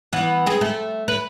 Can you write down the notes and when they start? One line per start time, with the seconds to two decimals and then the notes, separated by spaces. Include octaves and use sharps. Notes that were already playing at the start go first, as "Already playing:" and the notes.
0.13 E3 B3
0.46 C4 G#4
0.61 A3
1.08 B4